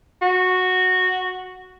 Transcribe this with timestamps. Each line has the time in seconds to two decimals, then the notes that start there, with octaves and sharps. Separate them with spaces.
0.22 F#4